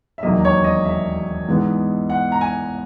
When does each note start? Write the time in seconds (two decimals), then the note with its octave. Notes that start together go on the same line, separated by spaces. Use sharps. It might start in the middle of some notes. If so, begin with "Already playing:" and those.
0.18 E5
0.23 E1 D#2 D#3 F#3 A#3 D#5
0.45 C#5
0.64 D#5
0.85 E5
1.48 G#2 E3 G#3 B3
2.10 F#5
2.32 A#5
2.41 G#5